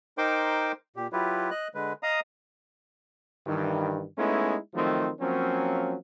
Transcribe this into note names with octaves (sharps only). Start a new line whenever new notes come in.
D#4 A#4 C5 G5 C6 D6
A#2 G4
F#3 E4 F4 G4 B4
D#5 F#6
D3 G#3 B4
D#5 F5 A#5 D#6
G2 D#3 E3
G#3 A3 B3 C#4 D#4 E4
D#3 F3 F#3 A3 C4 D#4
F3 F#3 A#3 C4 C#4